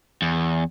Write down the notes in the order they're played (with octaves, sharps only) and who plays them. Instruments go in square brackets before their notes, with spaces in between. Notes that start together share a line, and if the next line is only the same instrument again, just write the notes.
[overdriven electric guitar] E2